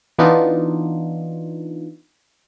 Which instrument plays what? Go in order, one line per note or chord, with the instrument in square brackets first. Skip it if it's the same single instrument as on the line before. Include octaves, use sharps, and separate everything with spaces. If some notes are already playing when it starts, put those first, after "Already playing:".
[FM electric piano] E3 B3 D4 D#4 F4